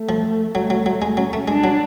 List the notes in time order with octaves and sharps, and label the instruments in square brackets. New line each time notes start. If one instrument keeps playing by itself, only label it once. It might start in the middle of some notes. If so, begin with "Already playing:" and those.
Already playing: [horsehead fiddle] A3
[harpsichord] F3
[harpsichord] F#3 [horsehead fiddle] A3
[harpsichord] F#3
[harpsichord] F#3 [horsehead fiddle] A3
[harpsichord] G#3
[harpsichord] F#3 [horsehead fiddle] C#4
[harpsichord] A3
[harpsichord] G#3 [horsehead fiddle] D4
[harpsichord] F#3